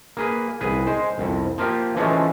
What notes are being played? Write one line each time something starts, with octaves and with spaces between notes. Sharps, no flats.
A#3 G#4 B4
C2 G#4 B4
G#3 C5
C2 F2
F3 A#3 F4 G4
E3 F3 G#3 A3 C#4